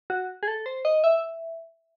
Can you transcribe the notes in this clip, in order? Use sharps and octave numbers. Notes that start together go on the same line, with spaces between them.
F#4
G#4
A4
C5
D#5
E5